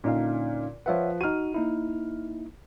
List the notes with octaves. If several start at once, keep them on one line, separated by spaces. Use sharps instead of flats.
A#2 D3 C#4 D#4 F5
F3 F4 B4 C#5 E5 F#5
D#4 F#4 F6 D#7
A#3 D#4 E4